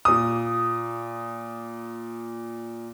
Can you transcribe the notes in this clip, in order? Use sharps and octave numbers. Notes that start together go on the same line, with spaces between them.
A#2 D#6